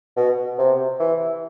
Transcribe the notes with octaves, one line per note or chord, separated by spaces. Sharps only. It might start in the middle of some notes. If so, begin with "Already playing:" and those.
B2
C3
E3